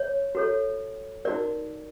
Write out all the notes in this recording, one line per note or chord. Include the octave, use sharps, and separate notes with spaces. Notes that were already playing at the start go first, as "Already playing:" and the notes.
Already playing: C#5
F#4 A4 C#5
D#4 F#4 A#4 D5